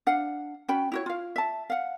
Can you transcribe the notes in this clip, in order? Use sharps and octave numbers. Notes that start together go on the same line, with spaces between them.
D4 F5 F#5
C#4 F#4 G5 B5
E4 F#4 C#5
F4 F5
E5 A5
F5 F#5